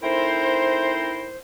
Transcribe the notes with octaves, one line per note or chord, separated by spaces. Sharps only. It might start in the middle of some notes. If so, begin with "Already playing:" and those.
A3 C4 D#4 E4 A#4 C5